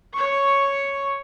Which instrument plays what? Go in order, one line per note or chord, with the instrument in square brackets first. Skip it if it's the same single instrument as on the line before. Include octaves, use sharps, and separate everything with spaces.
[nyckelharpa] C#5 C#6